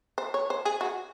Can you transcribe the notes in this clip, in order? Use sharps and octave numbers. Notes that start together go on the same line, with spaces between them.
C5
C#5
C5
G#4
F#4